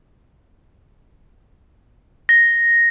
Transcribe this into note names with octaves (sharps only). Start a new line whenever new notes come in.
A#6